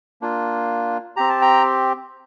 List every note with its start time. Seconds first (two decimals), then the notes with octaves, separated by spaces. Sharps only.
0.21 A#3 D4 F4
1.16 C4 G4 A#5
1.29 A5
1.42 G5 A#5